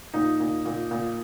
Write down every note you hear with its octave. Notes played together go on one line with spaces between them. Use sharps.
A#2 D#4
A#2
A#2
A#2